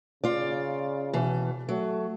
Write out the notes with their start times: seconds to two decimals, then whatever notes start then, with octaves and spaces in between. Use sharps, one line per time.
0.24 C#3 F4 D5
1.13 B2 E3
1.69 F#3 A3